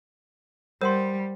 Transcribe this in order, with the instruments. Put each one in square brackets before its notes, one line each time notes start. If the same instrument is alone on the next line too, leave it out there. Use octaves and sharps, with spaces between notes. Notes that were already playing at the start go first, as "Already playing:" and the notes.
[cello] G3 [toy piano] A#4 F#5 C6 [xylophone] C5